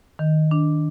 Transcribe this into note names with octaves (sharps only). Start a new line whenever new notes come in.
D#3
D4